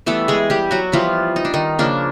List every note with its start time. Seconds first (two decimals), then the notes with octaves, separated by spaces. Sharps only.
0.06 E3 G3 A3 B3 A4
0.28 G#3 G#4
0.50 G3 G4
0.71 F#3 F#4
0.92 E3 F3 G3 B3 F4
1.36 D#4
1.45 D4
1.54 D#3 D#4
1.79 C#3 F3 A#3 D4